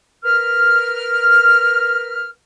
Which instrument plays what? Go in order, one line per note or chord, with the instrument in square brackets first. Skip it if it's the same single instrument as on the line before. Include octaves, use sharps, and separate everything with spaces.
[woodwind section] A#4 B4 F6